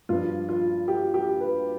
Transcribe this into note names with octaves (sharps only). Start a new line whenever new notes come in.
G2 F3 F4
F4
G4
G4
B4